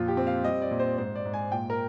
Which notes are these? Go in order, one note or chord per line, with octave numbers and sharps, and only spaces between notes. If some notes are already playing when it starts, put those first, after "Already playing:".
Already playing: F2 A#2 F4
G4
C4
F5
G3 D#5
D5
A#2
C5
G#2 C5
D5
G#2
G#5
A#2 G5
A#4